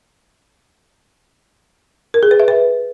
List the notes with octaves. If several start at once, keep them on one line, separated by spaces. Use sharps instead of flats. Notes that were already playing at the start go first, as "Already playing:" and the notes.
A#4
G#4
B4
E5
B4